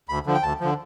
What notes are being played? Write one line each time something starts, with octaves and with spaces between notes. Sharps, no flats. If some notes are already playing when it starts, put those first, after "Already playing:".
D2 B5
D3 F3
G5
D2 A5
D3 F3